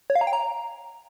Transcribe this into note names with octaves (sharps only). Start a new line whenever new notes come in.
C#5
F5
A#5
G5
A#5